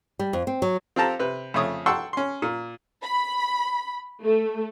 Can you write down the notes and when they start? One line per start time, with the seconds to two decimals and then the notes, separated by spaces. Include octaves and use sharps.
0.19 G3
0.33 F2
0.47 C4
0.62 F#3
0.96 C4 F4 G4 A4 A5 A#5
1.19 C3 B4
1.54 F2 C#3 A3 C#5 D#6
1.86 F#5 G5 A5 C6 C#6 E6
2.13 C#4 C6
2.42 A#2
3.03 B5
4.23 A3